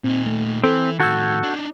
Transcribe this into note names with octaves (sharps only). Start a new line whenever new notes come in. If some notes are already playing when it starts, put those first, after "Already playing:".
A#2 C4 D#4
A3
E3 C4 A4
A2 D#3 F#4 A4 E6 G6 G#6
D4 D#4